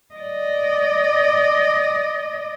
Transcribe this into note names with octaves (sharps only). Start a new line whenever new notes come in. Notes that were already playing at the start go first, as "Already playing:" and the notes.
D5 D#5